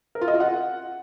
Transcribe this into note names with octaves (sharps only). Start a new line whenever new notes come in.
A#4
F4
D#5
F4
F#5